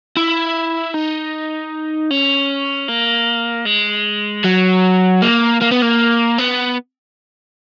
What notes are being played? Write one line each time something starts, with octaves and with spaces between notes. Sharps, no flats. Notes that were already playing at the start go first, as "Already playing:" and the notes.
E4
D#4
C#4
A#3
G#3
F#3
A#3
A#3
B3
A#3
B3